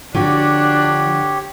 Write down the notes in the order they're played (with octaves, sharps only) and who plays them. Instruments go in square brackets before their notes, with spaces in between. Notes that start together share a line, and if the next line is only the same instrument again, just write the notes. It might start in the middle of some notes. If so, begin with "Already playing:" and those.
[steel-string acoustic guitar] D3 F#4 [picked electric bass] F3 [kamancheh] D4 [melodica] G4 C#5